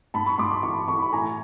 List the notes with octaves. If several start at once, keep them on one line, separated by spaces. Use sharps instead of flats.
G#2 A5 B5
B5 C#6
G#2 C6 D6
C6 D6
E3 B5 C#6
E3 B5 C#6
B5
A2 G#5 A#5